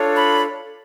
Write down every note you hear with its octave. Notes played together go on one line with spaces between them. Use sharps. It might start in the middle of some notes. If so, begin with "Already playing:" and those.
Already playing: D4 F4 A4 C#5
B5